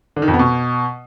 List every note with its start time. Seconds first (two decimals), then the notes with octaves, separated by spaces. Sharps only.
0.16 D3
0.22 D#3
0.28 F2
0.34 B3
0.39 B2